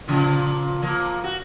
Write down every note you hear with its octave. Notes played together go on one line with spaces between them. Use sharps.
A#2 C#3 F3
F3 A#3
F#4